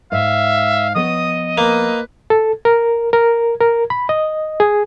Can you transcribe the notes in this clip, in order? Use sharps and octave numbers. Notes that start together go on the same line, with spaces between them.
G#2 E5 F5
F3 B3 C#5 D#5 D#6
A#3 B4
A4
A#4
A#4
A#4
B5
D#5
G#4